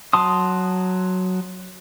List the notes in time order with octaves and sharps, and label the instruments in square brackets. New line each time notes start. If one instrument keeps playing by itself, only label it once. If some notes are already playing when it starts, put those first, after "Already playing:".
[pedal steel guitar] F#3 A5 C6 D#6